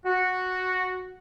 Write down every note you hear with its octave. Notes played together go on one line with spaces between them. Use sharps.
F#4